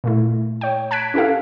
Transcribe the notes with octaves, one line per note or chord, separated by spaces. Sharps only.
A#2 A3 E4
C#5 G5
A5 F#6 G#6 B6 D7
C#4 E4 G4 A4 F5